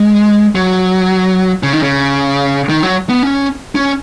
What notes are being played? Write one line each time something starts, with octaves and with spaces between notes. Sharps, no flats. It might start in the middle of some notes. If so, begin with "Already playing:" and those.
Already playing: G#3
F#3
C#3
D#3
C#3
D#3
F#3
B3
C#4
C#4